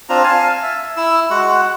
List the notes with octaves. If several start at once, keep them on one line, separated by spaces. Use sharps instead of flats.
C4 D4 F4 A#5
F5 G#5 A5
E5
E4 E6
G#3 F#4 F#5